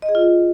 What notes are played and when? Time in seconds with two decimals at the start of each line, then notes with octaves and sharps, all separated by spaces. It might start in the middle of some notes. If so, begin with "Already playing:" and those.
0.02 D#5
0.09 G#4
0.15 F4